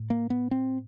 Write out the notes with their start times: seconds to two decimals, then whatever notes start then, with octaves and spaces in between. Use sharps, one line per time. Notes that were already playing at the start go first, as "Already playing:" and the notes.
Already playing: A2
0.10 A#3
0.30 B3
0.51 C4